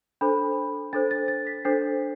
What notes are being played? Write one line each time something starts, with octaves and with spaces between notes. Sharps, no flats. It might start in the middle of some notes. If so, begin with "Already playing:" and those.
D4 A4 C5 B5
D4 A4 C5 A6
A6
A6
B6
D4 A4 C5 C7